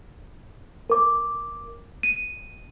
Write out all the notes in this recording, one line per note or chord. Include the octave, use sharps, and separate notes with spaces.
A#4 D6
D#7